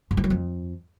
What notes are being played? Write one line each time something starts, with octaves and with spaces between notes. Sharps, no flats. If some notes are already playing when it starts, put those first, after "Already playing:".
G2
E3
F#3
F2